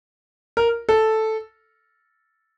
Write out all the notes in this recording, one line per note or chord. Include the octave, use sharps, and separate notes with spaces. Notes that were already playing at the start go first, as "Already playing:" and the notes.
A#4
A4